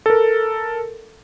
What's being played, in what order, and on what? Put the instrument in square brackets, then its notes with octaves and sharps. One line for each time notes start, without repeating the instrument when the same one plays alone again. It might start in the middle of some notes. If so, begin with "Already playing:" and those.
[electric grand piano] A4 A#4